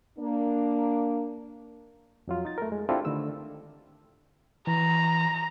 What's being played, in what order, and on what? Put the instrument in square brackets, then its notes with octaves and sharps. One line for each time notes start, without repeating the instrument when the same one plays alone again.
[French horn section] A#3 D4
[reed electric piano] F2 F#3 F4
D#4 A6
A3 A#4
G#3
C4 D4 E4 F4 G4 A4
D3 D#3 A3 E6
[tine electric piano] E3 [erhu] A#5